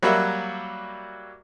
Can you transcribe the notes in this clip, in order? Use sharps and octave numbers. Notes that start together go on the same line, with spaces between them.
F#3 G3 A#3 F#4 E5